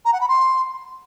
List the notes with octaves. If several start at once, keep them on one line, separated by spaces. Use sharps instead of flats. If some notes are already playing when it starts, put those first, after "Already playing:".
A#5
F#5
B5
C6